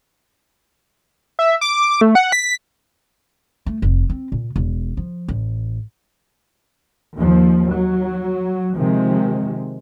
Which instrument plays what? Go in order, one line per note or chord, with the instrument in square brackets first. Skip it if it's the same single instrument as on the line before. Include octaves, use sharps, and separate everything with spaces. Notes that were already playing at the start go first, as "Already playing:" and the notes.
[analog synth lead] E5
D6
A3
F#5
B6
[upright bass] A3
F1
C4
A#2
E1
F3
A1
[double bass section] D#2 F3
F#3
C3 D#3 F3 G#3